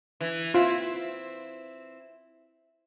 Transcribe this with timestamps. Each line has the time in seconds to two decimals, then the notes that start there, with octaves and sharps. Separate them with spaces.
0.20 E3
0.54 C4 E4 F4